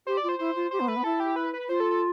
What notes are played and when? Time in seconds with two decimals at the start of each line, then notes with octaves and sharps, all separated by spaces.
0.06 G4 C5
0.17 D5
0.23 F4
0.29 C5
0.39 E4 C5
0.55 F4
0.71 G4 C5
0.80 B3
0.88 A3 B4
0.96 B3
1.04 E4 A4
1.20 G4
1.36 B4
1.53 B4
1.68 F4 C5
1.80 A4
1.91 A4